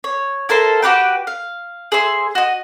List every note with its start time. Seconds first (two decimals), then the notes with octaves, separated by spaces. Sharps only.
0.04 C#5
0.49 E4 A4 A#4 C5
0.82 F#4 G4 B4 G5
1.27 F5
1.92 G#4 C5 E5 C6
2.35 F#4 D#5